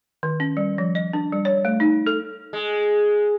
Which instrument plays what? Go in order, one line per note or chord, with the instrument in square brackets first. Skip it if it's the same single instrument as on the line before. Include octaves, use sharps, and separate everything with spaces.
[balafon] D#3
C#4
G3
F3
D#5
D4
G3
C#5
A3
D#4
A4
[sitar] G#3